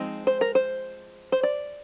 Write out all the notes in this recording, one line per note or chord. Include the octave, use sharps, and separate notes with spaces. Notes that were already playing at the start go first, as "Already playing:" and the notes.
Already playing: F3 G#3 C4 D#4
C5
A#4
C5
C5
D5